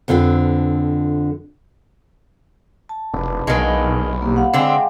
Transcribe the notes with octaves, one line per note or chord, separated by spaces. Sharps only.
F2 D3 C4 F4 B4
A5
F1 D4 B4
B1 D#3 G#3 F4 F#4 B4
A#3 G4
F5 F#5
D3 G#3 C4 G4 E5